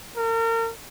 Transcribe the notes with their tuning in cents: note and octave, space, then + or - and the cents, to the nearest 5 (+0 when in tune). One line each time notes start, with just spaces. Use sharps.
A#4 -35